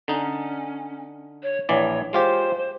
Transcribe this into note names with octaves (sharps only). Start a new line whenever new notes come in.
D3 C#4 D#4
C#5
A#1 E3 C#5 D5
G#3 F4 G4 C5